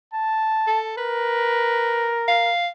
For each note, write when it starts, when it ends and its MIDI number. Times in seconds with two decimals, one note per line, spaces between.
0.13 0.84 81
0.67 0.93 69
0.97 2.50 70
0.97 2.14 71
2.28 2.67 77